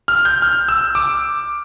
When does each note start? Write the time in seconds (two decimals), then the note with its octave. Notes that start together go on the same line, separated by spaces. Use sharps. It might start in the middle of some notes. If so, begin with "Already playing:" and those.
0.08 F6
0.25 G6
0.42 F6
0.69 E6
0.95 D6